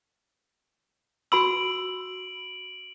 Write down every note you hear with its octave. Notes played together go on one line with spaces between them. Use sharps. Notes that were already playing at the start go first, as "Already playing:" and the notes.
F#4 B5 E6 D7 F#7